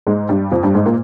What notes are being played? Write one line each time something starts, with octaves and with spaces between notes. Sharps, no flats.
G#2 G#3
G2 G3
F2 F3
G2 G3
G#2 G#3
A#2 A#3